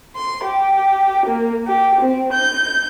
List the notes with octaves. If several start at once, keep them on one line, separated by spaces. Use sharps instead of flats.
C6
G4
A#3
G4
C4
G6